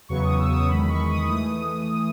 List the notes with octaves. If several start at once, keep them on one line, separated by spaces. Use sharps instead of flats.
E2 C#3 F#3 B3 C#6
D#6
E6
D#6
E2 D#3 G#3 B5
C#6
D#6
E3 A3 D#6